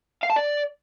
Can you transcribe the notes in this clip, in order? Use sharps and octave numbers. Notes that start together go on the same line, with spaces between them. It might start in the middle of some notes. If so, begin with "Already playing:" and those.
F5
A5
D5